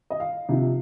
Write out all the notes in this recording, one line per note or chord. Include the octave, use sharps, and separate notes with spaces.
D#5
F5
C3 F3 D#4